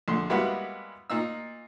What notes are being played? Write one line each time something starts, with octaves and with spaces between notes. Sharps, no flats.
A#1 D3 C6
G3 G#3 A#3 B3 E4 F#4
A#2 D#4 E6